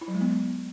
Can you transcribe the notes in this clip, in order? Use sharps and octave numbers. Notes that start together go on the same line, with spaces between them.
E4
F#3
G#3
B3